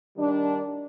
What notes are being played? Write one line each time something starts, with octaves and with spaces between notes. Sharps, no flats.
D#3 G3 D4